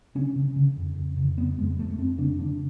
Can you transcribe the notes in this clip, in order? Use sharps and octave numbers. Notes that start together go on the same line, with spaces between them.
C#3 C#4
C#3
C#3
F2
F2
C#3
F2 B3
F2 G#3
F2 A3
F2 C4
C#3 D4
C#3 D4